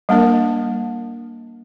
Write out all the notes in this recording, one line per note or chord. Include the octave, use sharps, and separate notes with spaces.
G3 A#3 D4 A#4